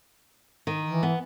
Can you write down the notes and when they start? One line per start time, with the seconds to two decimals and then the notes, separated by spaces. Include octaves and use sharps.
0.67 D#3
0.86 E3
1.03 B3